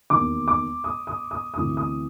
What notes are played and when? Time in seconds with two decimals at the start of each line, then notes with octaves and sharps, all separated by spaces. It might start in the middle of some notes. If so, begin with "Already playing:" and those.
0.10 E1 D#2 D#3 D6
0.48 D6
0.84 D#6
1.07 D#6
1.31 D#6
1.54 D2 C3 E3 D#6
1.77 D#6